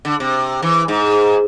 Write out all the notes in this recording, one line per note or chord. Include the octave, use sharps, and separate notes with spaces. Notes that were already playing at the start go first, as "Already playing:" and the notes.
D3
C3
E3
G#2